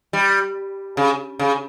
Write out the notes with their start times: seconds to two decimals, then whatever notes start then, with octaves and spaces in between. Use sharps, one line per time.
0.13 G3
0.97 C#3
1.39 C#3